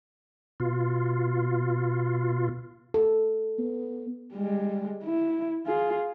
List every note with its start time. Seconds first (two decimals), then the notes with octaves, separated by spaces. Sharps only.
0.60 B2 F4
2.94 A4
3.59 B3
4.34 G3 G#3
5.04 E4
5.67 F4 G#4